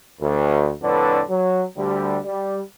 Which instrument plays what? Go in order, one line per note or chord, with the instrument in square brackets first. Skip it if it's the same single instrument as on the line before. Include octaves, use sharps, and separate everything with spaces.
[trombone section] D2
F2 A2 D3 D4 B4
F#3
D2 D3 G3
G3